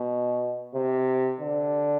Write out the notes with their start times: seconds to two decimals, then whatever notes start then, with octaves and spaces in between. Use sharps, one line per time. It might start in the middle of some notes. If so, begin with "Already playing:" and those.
Already playing: B2
0.75 C3
1.41 D3